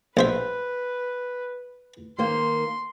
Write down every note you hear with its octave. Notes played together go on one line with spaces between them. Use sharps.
A#1 B4 C5 E5
D#3 A#3 C5 C6